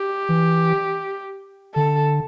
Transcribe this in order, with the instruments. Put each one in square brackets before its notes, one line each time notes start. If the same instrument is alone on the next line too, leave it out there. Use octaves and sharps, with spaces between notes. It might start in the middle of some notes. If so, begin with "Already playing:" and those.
Already playing: [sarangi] G4
[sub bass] E3
[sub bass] D3 [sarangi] A4